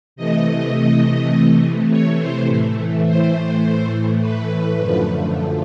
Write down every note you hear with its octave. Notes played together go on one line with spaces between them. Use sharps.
C3 E3 A3 D#5
C#5
C5
A2 E3 A3
C5
B4
F#2 D3 F3 A3